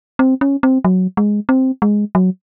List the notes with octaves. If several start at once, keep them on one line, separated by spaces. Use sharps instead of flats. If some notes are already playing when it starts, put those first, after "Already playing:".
C4
C#4
C4
F#3
G#3
C4
G#3
F#3